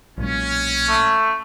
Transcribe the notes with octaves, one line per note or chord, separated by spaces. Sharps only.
B1 A#2 G#3 C#4
A3